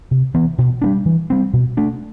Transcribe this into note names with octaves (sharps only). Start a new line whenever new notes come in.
C3
E3 B3
B2
G3 B3 D4
E3
G3 C4
B2
A3 D4